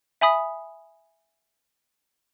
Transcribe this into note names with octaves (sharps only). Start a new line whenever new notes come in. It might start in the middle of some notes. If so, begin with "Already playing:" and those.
E5 G#5 B5 D#6 B6